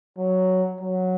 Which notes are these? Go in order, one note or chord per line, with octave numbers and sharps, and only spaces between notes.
F#3
F#3